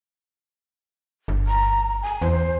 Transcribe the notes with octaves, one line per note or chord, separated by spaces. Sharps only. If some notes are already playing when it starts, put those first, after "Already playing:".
G1
A#5
G#5
E2 C5